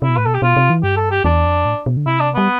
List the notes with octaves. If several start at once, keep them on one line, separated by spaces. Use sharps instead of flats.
C3 E4
B2
A2 B4
B2 A4
G4
B2 F4
C3
E3
G2 G4
A4
G4
E2 D4
F2
A2
B2
D3
C3 E4
D4
G3 B3